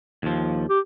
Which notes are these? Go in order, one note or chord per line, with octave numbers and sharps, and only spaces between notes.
D#2 F3
G4